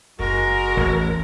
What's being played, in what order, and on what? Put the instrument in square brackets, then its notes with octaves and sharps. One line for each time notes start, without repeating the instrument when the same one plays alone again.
[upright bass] F#1 [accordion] G#3 F#4 [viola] A#4
[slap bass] A1 E2